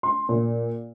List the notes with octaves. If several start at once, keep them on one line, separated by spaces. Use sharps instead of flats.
C6
A#2